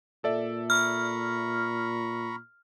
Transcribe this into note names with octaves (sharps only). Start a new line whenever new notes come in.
A#2 A4 D5 E5
A#5 B5 C#6 F6